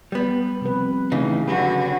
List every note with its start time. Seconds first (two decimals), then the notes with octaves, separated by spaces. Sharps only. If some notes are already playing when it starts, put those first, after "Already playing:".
0.12 G3 B3
0.61 C3 F3 B4
1.12 A2 C#3 E3 D#4
1.47 D3 F#3 F#4 G4 B4